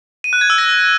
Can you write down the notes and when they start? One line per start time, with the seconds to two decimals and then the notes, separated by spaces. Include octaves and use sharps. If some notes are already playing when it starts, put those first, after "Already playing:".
0.24 D#7
0.33 F#6
0.41 G#6
0.50 E6
0.58 A#6